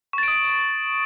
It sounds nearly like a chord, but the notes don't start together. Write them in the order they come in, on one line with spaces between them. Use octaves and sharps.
C#6 A6 D7 D#6